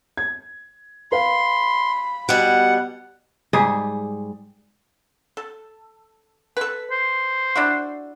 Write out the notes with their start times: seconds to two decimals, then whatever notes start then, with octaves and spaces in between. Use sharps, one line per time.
0.17 G#6
1.12 B4 F5 B5 C6
2.29 B2 G3 F#5
3.53 G#2 G3 G#4
5.37 A4
6.57 A4 B4
6.91 C5
7.56 D4 E4 F#4